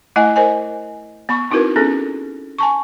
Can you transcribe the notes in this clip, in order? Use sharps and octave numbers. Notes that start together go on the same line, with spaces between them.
A3 E4 D#5 F#5 G#5
A#4 C5 D#5 G#5
B3 B5 C#6
C4 D#4 E4 F#4 A#4 B4
B3 C#4 G#4 A4
G#5 A5 C#6